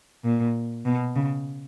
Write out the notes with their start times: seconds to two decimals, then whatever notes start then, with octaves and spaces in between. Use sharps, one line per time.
0.24 A#2
0.86 B2
1.16 C#3